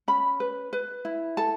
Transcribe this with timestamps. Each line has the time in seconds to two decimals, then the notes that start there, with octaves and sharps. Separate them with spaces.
0.08 C#4 B5
0.40 B4
0.73 B4
1.05 E4
1.37 A4 A5